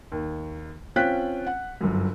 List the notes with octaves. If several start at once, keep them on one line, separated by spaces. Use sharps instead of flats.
D#2
C4 C#4 F4 G5 F#6 B6
F#5
G1 F#2